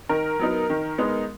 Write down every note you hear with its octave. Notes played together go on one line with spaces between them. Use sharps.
D#3 A#4
F#3 B3 D#4
D#3
G#3 B3 D#4